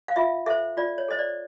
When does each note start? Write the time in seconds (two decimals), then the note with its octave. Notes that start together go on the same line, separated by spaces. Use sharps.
0.08 F5
0.16 F4 E5
0.46 A4 C5 E5
0.77 F4 D5
0.98 C#5
1.08 A4 C5 D#5
1.19 D5